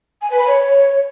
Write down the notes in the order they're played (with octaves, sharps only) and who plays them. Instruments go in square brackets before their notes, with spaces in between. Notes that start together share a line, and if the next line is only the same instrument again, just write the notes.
[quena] G#5
B4
B5
C#5